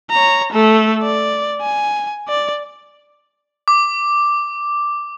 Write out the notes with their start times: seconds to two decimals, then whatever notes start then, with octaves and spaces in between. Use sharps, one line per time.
0.11 C#5 A#5
0.52 A3 A4
1.02 D5
1.61 G#5
2.28 D5
3.68 D6